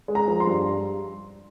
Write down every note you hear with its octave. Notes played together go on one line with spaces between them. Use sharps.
G#3
A#5
F3
C6
G2